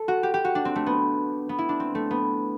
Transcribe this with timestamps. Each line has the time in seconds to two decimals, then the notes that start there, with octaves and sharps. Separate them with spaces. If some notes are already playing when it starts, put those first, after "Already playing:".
Already playing: A4
0.08 F#4
0.23 G4
0.34 G4
0.45 F#4
0.55 D4
0.65 C4
0.76 A3
0.86 B3
1.49 B3
1.58 E4
1.69 D4
1.80 C4
1.95 A3
2.11 B3